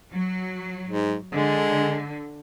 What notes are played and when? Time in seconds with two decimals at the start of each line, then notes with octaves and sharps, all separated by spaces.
0.12 F#3
0.87 G#2
1.33 D3 G#3